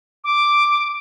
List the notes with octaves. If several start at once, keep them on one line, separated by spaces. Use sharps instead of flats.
D6